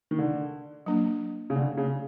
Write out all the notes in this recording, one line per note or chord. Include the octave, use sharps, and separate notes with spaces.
D#3
D3
F#3 A#3 D4
C#3
D3
C#3